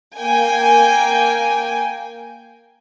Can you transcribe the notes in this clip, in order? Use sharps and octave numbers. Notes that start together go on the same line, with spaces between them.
A#3 G5 G#5